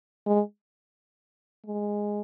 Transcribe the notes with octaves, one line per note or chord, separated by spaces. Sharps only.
G#3
G#3